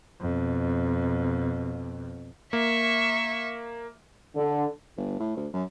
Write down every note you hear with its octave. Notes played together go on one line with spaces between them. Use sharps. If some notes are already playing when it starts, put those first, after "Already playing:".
F2 B2
A#3 E5 C#6
D3
G1
A2
D2
F#2